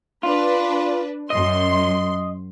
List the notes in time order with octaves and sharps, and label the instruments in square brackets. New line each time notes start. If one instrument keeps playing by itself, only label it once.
[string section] D4 B4 [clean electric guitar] F4
[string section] F#2 C6 [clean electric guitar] D#5